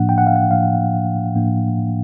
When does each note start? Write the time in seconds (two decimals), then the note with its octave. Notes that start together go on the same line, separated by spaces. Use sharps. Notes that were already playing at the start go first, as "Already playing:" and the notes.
Already playing: A2 F3 A#3 D4 F#5
0.09 G5
0.18 F#5
0.27 F5
0.36 F#5
0.51 A2 F3 A#3 D4 F5
1.35 A2 F3 A#3 D4